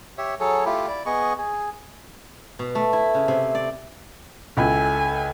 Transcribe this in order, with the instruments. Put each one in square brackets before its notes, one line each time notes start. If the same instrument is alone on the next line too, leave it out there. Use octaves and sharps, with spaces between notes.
[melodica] G4 C#5 E5
F#3 G#4 A4 C#5
A3 E4 F4 G4
E4 D5
B3 G#4 D#5 C#6
G#4
[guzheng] B2
A3
E4
C#3
C3
D5
[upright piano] C#2 E4 B5 [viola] A4 G#5